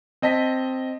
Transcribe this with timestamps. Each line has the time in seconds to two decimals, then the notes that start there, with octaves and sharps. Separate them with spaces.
0.22 C4 D#5 A5 B6